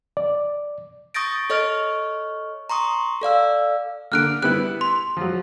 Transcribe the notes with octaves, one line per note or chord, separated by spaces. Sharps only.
D5
C#6 D#6 G6 A6 A#6 D7
A4 C#5 D#5 C#6 F6
A#5 C6 C#6 D#6
A4 D5 F5 E6
D3 A#3 F6 F#6 D7
G3 B3 E4 F#6
C6
F3 F#3